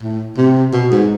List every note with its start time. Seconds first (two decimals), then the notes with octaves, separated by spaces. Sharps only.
0.02 A2
0.38 C3
0.73 B2
0.92 G#2